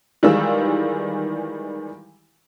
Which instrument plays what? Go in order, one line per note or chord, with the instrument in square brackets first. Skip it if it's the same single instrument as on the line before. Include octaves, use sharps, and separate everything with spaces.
[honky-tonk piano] D#3 E3 G3 G#3 F4 E6